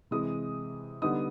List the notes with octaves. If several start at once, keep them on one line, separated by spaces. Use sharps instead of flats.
C3 E3 G#3 D#6
D3 G3 B3 D#4 D#6